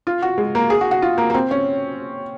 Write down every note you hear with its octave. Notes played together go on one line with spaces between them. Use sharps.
F4
F#4
G#3
A#3
G#4
F#4
F#4
F4
A#3
A#3
C4
C#4